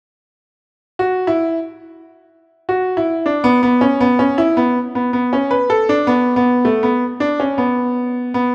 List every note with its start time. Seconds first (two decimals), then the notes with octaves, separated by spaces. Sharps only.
0.99 F#4
1.27 E4
2.69 F#4
2.97 E4
3.26 D4
3.44 B3
3.63 B3
3.81 C#4
4.01 B3
4.19 C#4
4.38 E4
4.57 B3
4.95 B3
5.13 B3
5.33 C#4
5.51 B4
5.70 A4
5.89 D4
6.07 B3
6.36 B3
6.65 A3
6.83 B3
7.20 D4
7.40 C#4
7.58 B3
8.34 B3